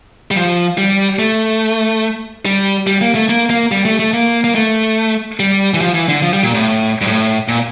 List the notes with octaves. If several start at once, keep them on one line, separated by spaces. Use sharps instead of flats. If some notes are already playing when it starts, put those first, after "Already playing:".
G3
F3
G3
A3
G3
G3
A#3
A3
A#3
A#3
G3
A3
A3
A#3
A#3
A3
G3
E3
F3
E3
D3
F3
G3
A#2
A2
G2
A2
A#2